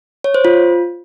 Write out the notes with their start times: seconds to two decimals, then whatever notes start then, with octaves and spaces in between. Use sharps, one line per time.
0.24 C#5
0.34 C5
0.45 F4